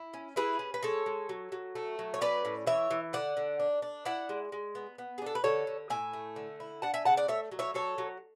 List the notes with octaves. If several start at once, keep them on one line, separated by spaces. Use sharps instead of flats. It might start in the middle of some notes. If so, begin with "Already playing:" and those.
Already playing: E4
C#4
E4 G#4 B4
C#4
B4
G#3 A4 C#5
G#3
F#3
F#3
A3
F#3
C#5
C#4 B4 D5
A2
E3 C#5 E5
E3
D3 D5 F#5
D3
D4
D4
E4 D5 F#5
G#3
G#3
B3
B3
G#4
D4 A4
B4
D3 A4 C#5
D3
A2 E5 G#5
A3
D3
E4
D4 F#5 A5
E5 G#5
C#3 F#5 A5
D5 F#5
A3 C#5 E5
F#3
C#5 E5
F#3 A4 C#5
F#3